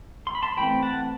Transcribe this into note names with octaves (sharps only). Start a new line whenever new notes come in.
C6
B5
A5 C6
E3 A3 C4 G5 B5
F#5 A5